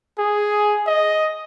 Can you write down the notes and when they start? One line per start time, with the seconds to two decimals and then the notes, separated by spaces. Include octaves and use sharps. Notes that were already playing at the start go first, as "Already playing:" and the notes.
0.19 G#4
0.87 D#5